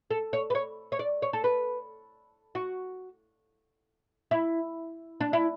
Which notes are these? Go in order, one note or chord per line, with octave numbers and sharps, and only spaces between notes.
A4
C#5
B4
C#5
C#5
D5
C#5
A4
B4
F#4
E4
D4
E4